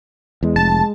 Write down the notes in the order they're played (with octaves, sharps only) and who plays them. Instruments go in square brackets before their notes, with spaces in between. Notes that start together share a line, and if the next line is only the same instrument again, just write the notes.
[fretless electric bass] E2 [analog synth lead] G#3
[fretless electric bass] F1 [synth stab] A5 A6